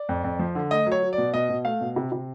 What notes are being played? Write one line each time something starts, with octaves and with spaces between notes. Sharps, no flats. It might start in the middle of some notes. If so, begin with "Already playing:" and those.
Already playing: D5
F2
F2
F3
D3
A3 D#5
F#3
C#5
F#3
D5
B2
B2 D#5
B2
A3 F5
B2
C3
C3